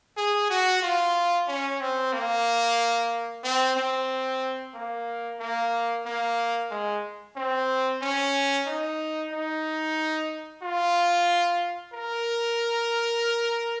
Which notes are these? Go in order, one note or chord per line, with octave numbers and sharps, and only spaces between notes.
G#4
F#4
F4
C#4
C4
A#3
C4
C4
A#3
A#3
A#3
G#3
C4
C#4
D#4
D#4
F4
A#4